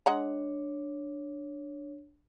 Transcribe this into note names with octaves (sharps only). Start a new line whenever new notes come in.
G#3 D4 C#5 F#5 A#5